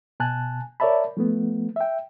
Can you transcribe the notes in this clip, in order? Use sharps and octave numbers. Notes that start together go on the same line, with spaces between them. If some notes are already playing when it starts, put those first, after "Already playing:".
B2 G#5 A5 F#6
A#4 C#5 D5 E5 A5 B5
F3 A3 B3
E5 G5